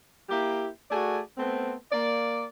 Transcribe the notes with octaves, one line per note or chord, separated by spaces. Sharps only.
A#3 E4 G4
A3 F#4 G#4 D5 G#5
A3 B3 C4
A#3 D5